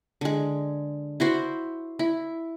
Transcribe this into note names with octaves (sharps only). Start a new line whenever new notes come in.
D3 G#3
E4 F#4 C5
E4